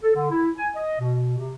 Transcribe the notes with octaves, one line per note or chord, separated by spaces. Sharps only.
A4
D3
E4
G#5
D#5
B2
C3